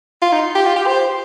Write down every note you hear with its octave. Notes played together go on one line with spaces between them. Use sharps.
F4
D#4
G4
F4
G4
C5